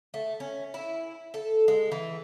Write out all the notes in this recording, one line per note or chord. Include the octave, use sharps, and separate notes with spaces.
A3
C#4
E4
A4
G#3
E3